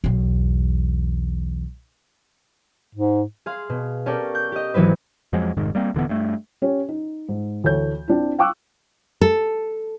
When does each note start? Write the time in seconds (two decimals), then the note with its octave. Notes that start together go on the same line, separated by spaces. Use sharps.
0.04 B1 E2
2.95 G#2
3.46 G#4 F5 C6
3.69 B2
4.06 C#4 G4 A4 A#4 D5 G5
4.35 G6
4.52 G4 D#5
4.74 G#1 E3 F#3 C4 B4
5.33 F2 F3 F#3 G#3
5.57 F1 G#2 D#3
5.75 G3 A#3 C4
5.94 D#1 D3 E3 B3
6.09 G2 A3
6.62 C#4 G4 C#5
6.89 D#4
7.29 G#2
7.64 D2 E3 A4 C#5 G6
8.08 C4 D4 E4
8.39 F5 G5 C#6 D6 E6 F#6
9.21 A4